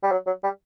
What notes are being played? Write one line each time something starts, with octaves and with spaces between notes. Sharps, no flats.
G3
F#3
F#3
G3